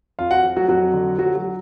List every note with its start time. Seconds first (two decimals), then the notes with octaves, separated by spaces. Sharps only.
0.19 F2 F4 F5
0.31 F#4 F#5
0.43 F3
0.56 F#3 F#4
0.68 F2 F#3 F#4
0.94 D3
1.18 F3 F#3 F#4
1.35 F#3 F#4
1.44 F3